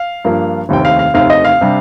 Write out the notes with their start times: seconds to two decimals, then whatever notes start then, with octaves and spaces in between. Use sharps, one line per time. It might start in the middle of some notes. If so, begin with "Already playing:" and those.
Already playing: F5
0.25 G2 F3 A#3 D4
0.69 F1 D#2 D#3 A3 C4 G5
0.85 F5
0.99 F5
1.14 F1 D#2 D#3 A3 C4 F5
1.30 D#5
1.45 F5
1.61 C3 G3 D4